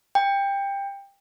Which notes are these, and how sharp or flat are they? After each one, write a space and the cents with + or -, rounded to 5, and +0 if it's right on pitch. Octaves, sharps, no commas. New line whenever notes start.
G5 +20